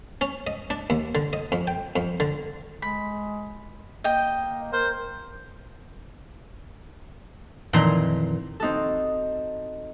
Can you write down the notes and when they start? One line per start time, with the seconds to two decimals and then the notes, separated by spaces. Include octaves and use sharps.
0.21 C#4
0.47 D#5
0.70 D4
0.90 D#2
1.15 D3
1.33 D#5
1.52 F2
1.67 G5
1.96 F2
2.20 D3
2.82 G#3 B5
4.04 A#3 D#5 G5
4.73 A#4 C5
7.73 F2 A#2 D#3 E3 A#5 C6
8.60 C4 D#4 F#4 A4